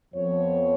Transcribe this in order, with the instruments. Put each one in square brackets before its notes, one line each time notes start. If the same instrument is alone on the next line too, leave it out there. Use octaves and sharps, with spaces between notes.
[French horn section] F2 F3 B3 C#5